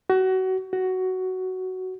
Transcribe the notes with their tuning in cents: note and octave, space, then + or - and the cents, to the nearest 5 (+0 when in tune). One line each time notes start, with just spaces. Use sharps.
F#4 +25
F#4 +10